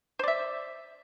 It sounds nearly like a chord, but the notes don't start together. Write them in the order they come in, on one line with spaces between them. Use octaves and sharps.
C5 D5 E5